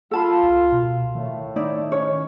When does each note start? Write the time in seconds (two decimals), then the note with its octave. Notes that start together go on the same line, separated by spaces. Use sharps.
0.11 F4 A4 A5 B5
0.43 C#2
0.72 B2
1.15 A2 D#3 A3
1.56 D#4 E4 D5
1.92 C#4 D#4 C#5